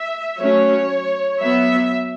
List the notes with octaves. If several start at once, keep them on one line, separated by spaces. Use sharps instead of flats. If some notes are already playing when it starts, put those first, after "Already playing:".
Already playing: E5
F#3 A3 C#4 C#5
F#3 B3 E5